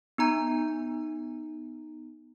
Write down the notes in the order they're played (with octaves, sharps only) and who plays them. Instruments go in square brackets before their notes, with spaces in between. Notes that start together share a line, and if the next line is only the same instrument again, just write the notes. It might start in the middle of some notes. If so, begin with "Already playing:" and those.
[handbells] B3 D#4 A#5 G6